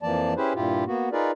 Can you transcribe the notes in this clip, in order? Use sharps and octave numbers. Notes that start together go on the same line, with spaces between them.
F2 E3 F3 A#3 D5 A5
C#4 E4 G4 G#4 B4 C5
G2 A#2 E4 F4 G4
A#3 B3 F#4
D#4 F4 G#4 A#4 B4 D5